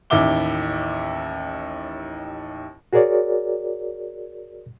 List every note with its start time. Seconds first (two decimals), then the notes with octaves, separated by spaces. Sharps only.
0.10 A1 D#2 E4 E5 D6 G7
2.93 F#4 G#4 A#4 C#5 D5